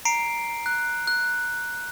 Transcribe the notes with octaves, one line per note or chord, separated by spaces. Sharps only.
A#5 C7 D7
F#6
F#6